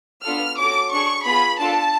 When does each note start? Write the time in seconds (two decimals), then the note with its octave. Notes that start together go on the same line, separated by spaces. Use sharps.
0.25 B3 D4 F4 A4 F6
0.58 C#4 F#4 A4 D6
0.91 D4 G#4 C#6
1.25 B3 F4 G#4 B5
1.59 D4 F4 A4 A5